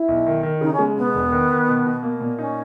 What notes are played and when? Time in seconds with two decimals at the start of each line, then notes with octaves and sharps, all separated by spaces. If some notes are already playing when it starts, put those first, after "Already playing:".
Already playing: E4
0.08 B1
0.26 D#3
0.43 D#3
0.61 C#3 D#4
0.73 C#4
0.79 G#3
0.97 B2 B3
1.15 E1
1.32 D#3
1.50 D#3
1.68 B2
1.86 B2
2.03 A#3
2.21 A#2
2.38 C#4 D#4